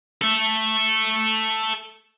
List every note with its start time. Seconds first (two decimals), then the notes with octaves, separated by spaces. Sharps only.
0.21 A4 E5